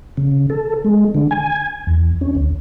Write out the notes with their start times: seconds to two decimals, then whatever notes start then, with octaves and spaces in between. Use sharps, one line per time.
0.17 C#3
0.50 A4
0.84 G#3
1.15 D3
1.31 G#5
1.87 E2
2.21 C#4
2.35 D2